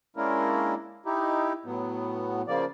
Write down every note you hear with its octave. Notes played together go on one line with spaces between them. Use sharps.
G#3 A#3 C#4 D4 E4 A#4
D#4 E4 G4
A2 F#3 B3
C#3 F3 A#3 D5